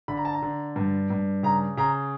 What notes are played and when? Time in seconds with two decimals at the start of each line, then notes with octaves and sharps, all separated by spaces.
0.08 D3 B5
0.17 A#5
0.25 A5
0.33 A#5
0.42 D3
0.76 G2
1.10 G2
1.43 C#3 A#5
1.77 C#3 A#5